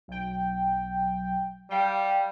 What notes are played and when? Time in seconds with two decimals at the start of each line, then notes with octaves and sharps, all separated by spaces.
0.08 B1 G5
1.70 G3 G4 F5 G5